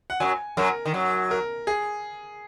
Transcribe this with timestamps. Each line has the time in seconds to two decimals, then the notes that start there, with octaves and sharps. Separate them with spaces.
0.10 F#5
0.20 F#2 F#3 G#5
0.57 F#2 F#3 A#4
0.86 D#3
0.94 F#2 F#3
1.31 A#4
1.67 G#4